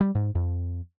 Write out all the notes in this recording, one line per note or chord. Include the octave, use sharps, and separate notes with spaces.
G3
G#2
F2